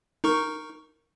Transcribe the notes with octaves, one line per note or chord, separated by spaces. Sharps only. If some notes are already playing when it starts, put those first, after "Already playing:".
D#4 A#4 C#6